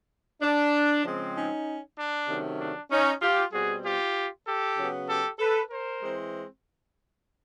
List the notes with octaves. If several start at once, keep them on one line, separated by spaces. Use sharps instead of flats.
D4
C#3 F3 G#3 C4
C#4 D#4
D4
C3 D#3 F#3 A3 C#4
D4
C#4 D#4
F4 G4
B2 G3 C4 F#4 G#4
F4 G4
G4 A4
C#3 F#3 B3
G4 A4
A4 B4
A#4 C5
E3 G#3 C4